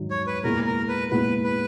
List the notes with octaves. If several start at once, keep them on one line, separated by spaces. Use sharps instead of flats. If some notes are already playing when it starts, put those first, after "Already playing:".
Already playing: G#2 D#3 F#3
C#5
B4
A#2 G#3 B3 E4 A#4
A#4
B4
A#2 G#3 B3 E4 B4
B4